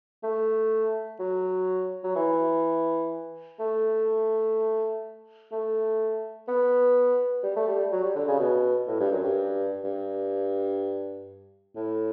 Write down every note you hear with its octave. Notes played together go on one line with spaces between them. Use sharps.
A3
F#3
F#3
E3
A3
A3
B3
G3
A3
G3
F#3
G3
D3
C#3
B2
A2
G2
F#2
G2
G2
A2